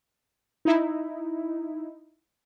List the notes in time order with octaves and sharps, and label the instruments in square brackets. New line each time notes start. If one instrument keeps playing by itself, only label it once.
[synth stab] D#4 E4